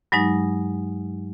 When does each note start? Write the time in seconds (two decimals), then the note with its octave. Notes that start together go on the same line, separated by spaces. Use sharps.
0.12 G2 F#3 G#3 D#4